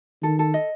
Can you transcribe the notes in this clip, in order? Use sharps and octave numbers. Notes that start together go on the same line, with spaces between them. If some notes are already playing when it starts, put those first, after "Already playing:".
D#3 A4
A4
D#5